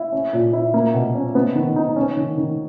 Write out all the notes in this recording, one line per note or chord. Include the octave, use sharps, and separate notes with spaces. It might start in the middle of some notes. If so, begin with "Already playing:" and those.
Already playing: E4
C#4
A#2
E4
A#3
B2
C#4
B3
D#3
D#4
C#4
D#3
D#3